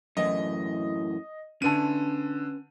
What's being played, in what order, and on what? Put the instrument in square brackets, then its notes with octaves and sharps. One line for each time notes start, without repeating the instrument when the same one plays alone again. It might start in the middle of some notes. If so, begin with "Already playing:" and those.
[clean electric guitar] F#2 A2 E3 [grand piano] D#5
[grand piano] D3 D#7 [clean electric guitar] C#4 B4 A5